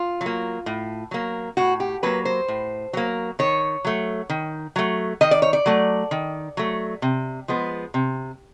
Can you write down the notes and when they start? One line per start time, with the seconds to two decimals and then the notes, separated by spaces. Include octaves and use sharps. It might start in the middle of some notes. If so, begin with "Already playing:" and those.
Already playing: F4
0.21 F#3
0.26 A#3
0.66 A2
1.11 F#3 A#3
1.57 A2 F#4
1.80 G4
2.03 F#3 A#3 B4
2.25 C5
2.48 A2
2.93 F#3 A#3
3.39 D#3 C#5
3.85 F#3 A3
4.30 D#3
4.76 F#3 A3
5.21 D#3 D#5
5.31 D5
5.42 C#5
5.53 D5
5.66 F#3 A3
6.11 D#3
6.57 F#3 A3
7.02 C3
7.48 F3 G#3 B3
7.94 C3